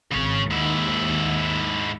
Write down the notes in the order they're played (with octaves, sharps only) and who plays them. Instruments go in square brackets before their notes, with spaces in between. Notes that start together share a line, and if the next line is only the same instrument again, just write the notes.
[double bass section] G#1 [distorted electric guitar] C#3 C#5
[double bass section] D#2 [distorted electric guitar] G#2 E4